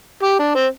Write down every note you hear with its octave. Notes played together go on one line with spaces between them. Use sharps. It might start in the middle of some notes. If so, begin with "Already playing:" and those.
G4
D4
C4